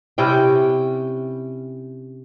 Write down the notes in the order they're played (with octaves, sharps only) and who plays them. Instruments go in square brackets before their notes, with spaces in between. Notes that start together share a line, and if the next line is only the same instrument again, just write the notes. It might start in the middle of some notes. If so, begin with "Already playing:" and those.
[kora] C3 C#4 E4 G5